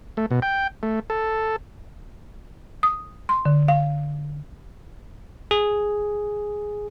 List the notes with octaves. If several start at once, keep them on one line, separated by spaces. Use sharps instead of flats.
A3
B2
G5
A3
A4
D#6
C6
D3
F5
G#4